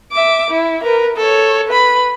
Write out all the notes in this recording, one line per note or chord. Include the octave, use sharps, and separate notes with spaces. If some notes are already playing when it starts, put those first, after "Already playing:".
E5 D6
E4
A#4 B4
A4 C#5
B4 B5